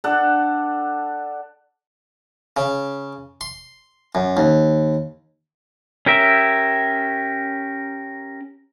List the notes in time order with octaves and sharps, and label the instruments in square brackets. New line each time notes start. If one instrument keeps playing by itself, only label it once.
[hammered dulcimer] D4 A4 F#5
[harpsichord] C#3
C6
F#2
D#2
[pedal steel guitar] C#4 G4 A#4 E5